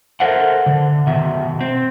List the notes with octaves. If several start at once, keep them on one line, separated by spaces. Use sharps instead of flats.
A4 A#4 C5 E5 F#5
D3
B2 D#3 E5
C4